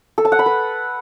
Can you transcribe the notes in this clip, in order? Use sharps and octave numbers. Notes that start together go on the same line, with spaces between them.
A4
A5
F#5
B5
B4